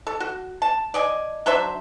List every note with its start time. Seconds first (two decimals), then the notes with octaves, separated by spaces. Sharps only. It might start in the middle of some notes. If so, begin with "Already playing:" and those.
0.07 A4
0.20 F#4
0.62 A5
0.94 D5 D#5 G#5
1.46 F#3 D4 C5 E5